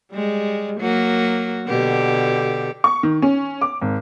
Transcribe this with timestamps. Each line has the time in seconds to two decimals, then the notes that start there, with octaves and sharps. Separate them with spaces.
0.12 G3 G#3
0.79 F#3 A#3 F#4
1.68 B2 D3 G4
2.84 C#6
3.03 D#3
3.22 C#4
3.61 D6
3.81 G#1